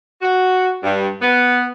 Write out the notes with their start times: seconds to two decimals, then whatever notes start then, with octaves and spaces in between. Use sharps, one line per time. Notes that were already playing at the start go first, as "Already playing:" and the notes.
0.22 F#4
0.83 G2
1.21 B3